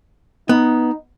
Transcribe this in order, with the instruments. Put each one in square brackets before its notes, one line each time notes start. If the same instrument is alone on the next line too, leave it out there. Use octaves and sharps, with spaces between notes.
[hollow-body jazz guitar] B3 [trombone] D#4